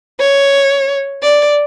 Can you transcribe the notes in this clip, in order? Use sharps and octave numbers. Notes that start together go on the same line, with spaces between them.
C#5
D5